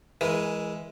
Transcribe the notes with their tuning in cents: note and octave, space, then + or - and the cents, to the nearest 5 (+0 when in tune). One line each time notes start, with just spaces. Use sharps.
E3 +0 G#3 +0 A#4 +25